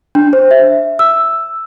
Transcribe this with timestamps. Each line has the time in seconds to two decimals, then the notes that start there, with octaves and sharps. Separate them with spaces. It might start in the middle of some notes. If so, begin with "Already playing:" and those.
0.15 D4
0.33 C5
0.51 E5
0.99 E6